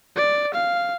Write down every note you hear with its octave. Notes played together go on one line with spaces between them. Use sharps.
D5
F5